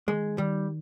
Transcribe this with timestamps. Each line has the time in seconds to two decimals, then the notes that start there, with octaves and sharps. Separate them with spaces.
0.07 D#3 G#3
0.38 D#3 G3